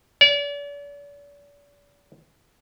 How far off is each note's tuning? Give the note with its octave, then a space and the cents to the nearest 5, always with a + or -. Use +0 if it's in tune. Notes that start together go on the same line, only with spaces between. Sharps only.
D5 -40